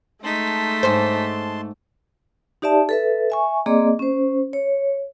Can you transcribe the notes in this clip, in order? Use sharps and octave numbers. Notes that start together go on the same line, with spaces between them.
G#3 A3 D#4 A5 C6 B6
G#2 C5
D#4 G4 D5 E5 A5
A4 B4 E5
E5 G#5 C#6
A#3 C4 G#4 D5 D#5 D6
C#4 C5
C#5